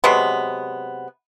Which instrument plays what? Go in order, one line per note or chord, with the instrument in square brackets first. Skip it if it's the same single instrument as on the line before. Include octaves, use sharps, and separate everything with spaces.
[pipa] C3 F#3 G#3 B3